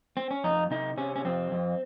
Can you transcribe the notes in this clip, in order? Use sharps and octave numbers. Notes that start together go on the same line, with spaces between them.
C4
C#4
F2 D#4
C3 D#4
C3 C#4
C#4
F2 C4
F2